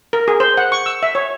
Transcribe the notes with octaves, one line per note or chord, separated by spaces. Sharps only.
A#4
G#4
C5
F#5
C#6
E6
E5
C#5